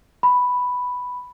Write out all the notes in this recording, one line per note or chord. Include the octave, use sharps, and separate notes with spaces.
B5